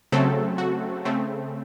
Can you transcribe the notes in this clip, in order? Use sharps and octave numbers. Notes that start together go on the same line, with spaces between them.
C#3 F#3 A3 C4 A4
F#4
C#3 A3 C4